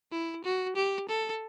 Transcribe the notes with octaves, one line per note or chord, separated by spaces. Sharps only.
E4
F#4
G4
A4